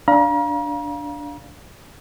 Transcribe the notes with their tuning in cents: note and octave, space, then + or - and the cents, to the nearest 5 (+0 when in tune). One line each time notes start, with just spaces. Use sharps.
D4 -5 F5 +0 A#5 +40